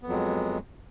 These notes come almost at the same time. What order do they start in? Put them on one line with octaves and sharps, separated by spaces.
B3 F2 F#3 G#3